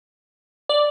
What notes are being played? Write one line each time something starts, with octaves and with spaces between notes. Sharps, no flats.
D5